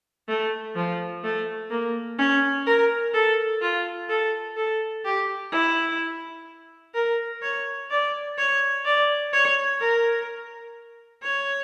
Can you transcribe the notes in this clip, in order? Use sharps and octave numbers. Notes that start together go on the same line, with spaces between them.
A3
F3
A3
A#3
C#4
A#4
A4
F4
A4
A4
G4
E4
A#4
C#5
D5
C#5
D5
C#5
A#4
C#5